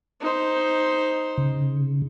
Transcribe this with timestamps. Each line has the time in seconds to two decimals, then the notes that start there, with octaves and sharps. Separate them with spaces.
0.20 D#4 C5
1.38 C#3